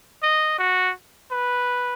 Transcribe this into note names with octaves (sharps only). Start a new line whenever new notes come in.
D#5
F#4
B4